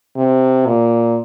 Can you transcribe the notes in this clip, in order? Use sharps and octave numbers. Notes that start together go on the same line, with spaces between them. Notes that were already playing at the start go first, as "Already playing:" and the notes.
C3
A#2